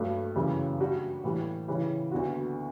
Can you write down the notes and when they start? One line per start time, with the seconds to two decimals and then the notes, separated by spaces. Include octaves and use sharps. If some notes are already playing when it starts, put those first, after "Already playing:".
Already playing: G2 F#3 A3
0.36 F#2 C#3 E3 G3
0.80 G3 D4 F#4
1.24 A2 E3 G3
1.68 C#3 E3 G3 C#4 E4
2.11 D2 D3 G3 B3 F#4